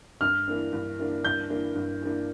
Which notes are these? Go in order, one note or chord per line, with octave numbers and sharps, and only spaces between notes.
G2 F6
E3 A#3 D4
G2
E3 A#3 D4
G2 G6
E3 A#3 D4
G2
E3 A#3 D4